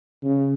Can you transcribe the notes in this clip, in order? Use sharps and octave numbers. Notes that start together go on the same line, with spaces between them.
C#3